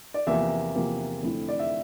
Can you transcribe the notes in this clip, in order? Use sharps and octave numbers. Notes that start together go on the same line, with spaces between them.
D5
E2 C3 F3 A#3 E5
E2 C3 F3 A#3
F2 D3 A3 E4
D5
E5